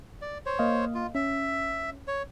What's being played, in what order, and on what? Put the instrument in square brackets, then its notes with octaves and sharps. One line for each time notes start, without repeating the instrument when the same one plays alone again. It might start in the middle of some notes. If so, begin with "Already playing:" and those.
[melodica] D5
C5 C#5
[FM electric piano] A#3 D#5 F5
[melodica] F4
[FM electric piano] C#4 [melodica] E5
[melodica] C#5